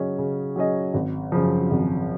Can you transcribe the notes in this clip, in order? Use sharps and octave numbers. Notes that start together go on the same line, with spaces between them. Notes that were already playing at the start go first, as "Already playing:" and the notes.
Already playing: C#3 F#3 C#4 G#4 D#5
C#3
F#3 C#4 G#4 D#5
G#1
F#2 C#3 F3
G#1